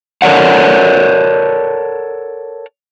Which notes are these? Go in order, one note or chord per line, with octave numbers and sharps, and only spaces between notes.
A4 A#4 C#5 D5 F#5